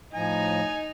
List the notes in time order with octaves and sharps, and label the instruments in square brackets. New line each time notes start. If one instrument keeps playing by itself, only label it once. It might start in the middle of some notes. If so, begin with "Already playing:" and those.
[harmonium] A2 F3 A#5 [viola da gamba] D#4 [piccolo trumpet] G#5